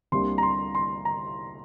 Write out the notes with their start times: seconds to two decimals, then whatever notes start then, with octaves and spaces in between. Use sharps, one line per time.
0.12 C2 C3 G3 A#3 D4 C6
0.38 A#5
0.43 C6
0.75 C6
1.05 A#5